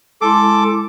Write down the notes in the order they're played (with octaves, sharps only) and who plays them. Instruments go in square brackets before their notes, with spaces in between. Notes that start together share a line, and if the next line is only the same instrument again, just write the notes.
[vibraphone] G#3 E4 C6 [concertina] A4 D6